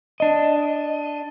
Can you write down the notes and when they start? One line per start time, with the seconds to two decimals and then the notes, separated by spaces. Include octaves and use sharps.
0.20 D4 D#5